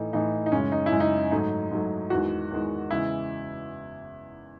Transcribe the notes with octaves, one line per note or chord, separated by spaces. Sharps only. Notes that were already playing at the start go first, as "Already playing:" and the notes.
Already playing: A2 E3 A3 D#4
A2 E3 A3 D#4
D#4
F#2 C#3 G#3 C#4
D#4
E4
F#2 C#3 G#3
D#4
G#2 F#3 A3 D#4
G#2 F#3 A3
E2 D#3 G#3 F#4
E2 D#3 G#3
E2 C#3 E3 G#3 E4